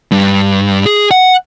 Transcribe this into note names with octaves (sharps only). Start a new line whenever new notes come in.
G2
G#4
F#5